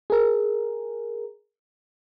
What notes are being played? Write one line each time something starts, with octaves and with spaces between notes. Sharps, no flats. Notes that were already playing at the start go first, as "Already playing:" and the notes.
G#4 A#4